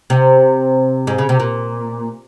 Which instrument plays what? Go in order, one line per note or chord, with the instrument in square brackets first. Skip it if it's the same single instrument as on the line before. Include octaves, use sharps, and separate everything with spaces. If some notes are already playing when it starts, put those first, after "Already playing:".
[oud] C3
G#2
C#3
C3
A#2